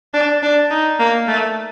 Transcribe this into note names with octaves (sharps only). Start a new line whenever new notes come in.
D4
D4
D#4
A#3
A3